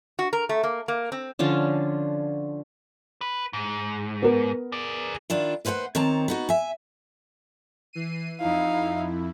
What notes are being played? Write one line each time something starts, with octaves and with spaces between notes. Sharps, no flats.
F#4
A#4
A3
A#3
A#3
C4
D3 F3 C#4 D4
B4
G#2
B3 A#4
G#4 D5
D#3 D4 E4 F4
D#2 B4 C5 F5 F#5
D#3 C4 C#5 A5 A#5
B3 D#4 F#4
E5 G#5
E3 C7 D#7
F2 D#4 E4 F5